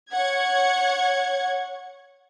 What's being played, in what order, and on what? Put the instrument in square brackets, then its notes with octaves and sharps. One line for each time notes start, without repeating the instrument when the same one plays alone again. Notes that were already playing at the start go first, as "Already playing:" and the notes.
[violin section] C#5 F#5 G#6